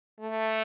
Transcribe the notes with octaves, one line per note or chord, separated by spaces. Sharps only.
A3